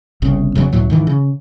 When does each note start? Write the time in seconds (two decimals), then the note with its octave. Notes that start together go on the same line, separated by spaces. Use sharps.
0.22 G1 C2 C#3
0.55 F1 C#3 F#3
0.73 C#2 A2 F#3
0.90 G#2 D#3 E3
1.07 C#3